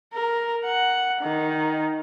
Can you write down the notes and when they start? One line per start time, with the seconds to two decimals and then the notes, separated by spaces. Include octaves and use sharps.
0.14 A#4
0.65 F#5
1.22 D#3